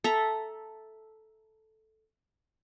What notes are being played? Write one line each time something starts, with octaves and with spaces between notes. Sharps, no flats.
A4 E5 A#5